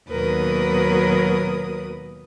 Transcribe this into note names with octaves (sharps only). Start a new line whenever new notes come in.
D#2 B2 F#3 A#4 B4 D#6